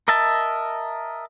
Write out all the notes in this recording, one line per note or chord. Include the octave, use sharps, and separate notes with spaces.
A#4 D#5 E5 A5